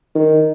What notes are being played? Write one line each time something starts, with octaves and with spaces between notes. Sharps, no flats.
D#3